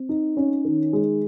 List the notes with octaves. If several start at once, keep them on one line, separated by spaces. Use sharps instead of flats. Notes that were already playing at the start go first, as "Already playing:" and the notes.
Already playing: C4
D#4
C#4
D#3
G#3